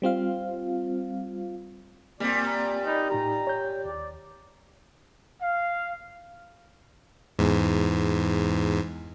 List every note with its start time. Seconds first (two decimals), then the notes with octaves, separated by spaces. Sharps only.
0.02 G3 C4 F4 F5
2.20 A#2 G3 A#3 C4 D5
2.46 A#5
2.85 D#4 D5 D#5 B5
3.10 A2 D#4 G4 A#5
3.47 C#5 G6
3.85 D#2 D5
5.42 F5
7.39 E2 G#2